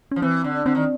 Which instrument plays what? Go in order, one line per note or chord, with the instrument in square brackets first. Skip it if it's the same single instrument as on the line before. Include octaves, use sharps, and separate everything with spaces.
[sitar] F3 [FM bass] C#4
[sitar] E3 [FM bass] C4
[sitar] D3
[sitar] D3 [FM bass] C4
[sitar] D#3